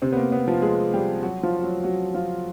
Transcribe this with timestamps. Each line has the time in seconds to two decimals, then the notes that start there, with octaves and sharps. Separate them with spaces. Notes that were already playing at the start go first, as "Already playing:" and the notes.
0.02 C3 C4
0.12 B3
0.17 A#3
0.32 B3
0.48 F3 F4
0.62 G#3 G#4
0.94 G3 G4
1.23 F#3 F#4
1.43 F3 F4
1.56 F4
1.63 F#3 F#4
1.84 F#3 F#4
2.14 F3 F4